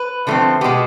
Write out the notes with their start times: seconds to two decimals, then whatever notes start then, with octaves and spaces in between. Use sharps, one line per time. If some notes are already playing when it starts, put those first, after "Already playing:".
Already playing: B4
0.27 D3 F3 A3 C4
0.61 B2 G#3 B3 G4